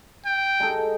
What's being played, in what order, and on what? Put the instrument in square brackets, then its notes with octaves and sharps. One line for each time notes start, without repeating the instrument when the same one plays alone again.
[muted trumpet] G5
[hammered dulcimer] G#3 D#4 A4